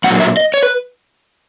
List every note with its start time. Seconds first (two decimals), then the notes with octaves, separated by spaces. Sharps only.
0.04 A#2 F#3 F#5
0.20 E5
0.37 D#5
0.54 C#5
0.63 B4